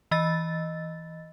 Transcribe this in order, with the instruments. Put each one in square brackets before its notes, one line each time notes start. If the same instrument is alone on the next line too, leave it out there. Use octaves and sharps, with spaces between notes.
[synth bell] E3 D#5 A6